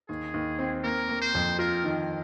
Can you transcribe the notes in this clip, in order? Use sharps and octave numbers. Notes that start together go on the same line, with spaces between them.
D#2 G#4
D#2
C4
A#3 A#4
A#3
C5
F2
F4 A#4
D#3